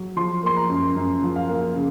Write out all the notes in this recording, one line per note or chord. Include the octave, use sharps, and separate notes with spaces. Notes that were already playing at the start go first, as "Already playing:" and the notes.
Already playing: F#3
F3 C6
A#3 C6
A#5
F#2
F#2
F3
F5
A#3
C#3